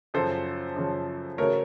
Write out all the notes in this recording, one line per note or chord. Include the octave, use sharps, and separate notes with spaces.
F#2 C#3 F3 A4 C5
F#2 C#3 F3
C#3 F#3 A3 A#4 C#5